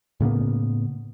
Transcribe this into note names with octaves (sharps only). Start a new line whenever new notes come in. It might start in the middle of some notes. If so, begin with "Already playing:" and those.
A2 C#3 A#3 B3